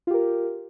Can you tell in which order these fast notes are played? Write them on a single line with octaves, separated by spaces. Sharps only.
F4 G4 A#4